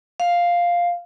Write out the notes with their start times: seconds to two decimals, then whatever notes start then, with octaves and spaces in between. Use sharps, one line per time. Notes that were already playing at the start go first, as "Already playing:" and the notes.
0.20 F5